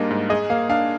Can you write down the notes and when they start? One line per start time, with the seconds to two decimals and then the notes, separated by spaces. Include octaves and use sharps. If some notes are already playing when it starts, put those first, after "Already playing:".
Already playing: G#2 G3 A#3 D4 D#5
0.11 G#2
0.30 G#4 D#5
0.50 A#3 F5
0.69 D4 F5